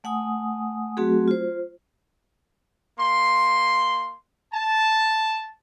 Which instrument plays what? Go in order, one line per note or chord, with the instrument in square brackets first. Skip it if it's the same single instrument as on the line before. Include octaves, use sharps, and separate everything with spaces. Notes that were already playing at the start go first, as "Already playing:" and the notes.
[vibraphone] A3 F#5 G#5 D#6
F#3 A3 C4 F#4 G#4
F4 C5
[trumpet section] A#3 C6
A5